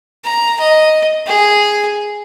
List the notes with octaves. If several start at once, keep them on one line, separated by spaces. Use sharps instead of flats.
A#5
D#5
G#4